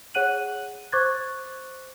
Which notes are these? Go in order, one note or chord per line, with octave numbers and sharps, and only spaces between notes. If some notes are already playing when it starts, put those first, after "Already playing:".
G#4 C#5 F#5 F#6 D#7 F#7
C5 C#6 D6 F#6 G#6 A6